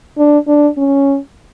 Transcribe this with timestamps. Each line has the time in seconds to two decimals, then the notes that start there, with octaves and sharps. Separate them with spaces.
0.18 D4
0.48 D4
0.77 C#4